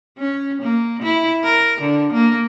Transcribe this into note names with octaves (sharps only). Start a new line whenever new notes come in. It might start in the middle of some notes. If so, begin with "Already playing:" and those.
C#4
A#3
E4
A#4
D3
A#3